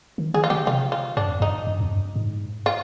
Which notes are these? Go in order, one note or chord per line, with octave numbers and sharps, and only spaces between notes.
D#3
D#3 G#4
F4
D3 G4
C3 F4
F4
G2 D4
F2
G2 D#4
G2
F2
G2
G#2
F4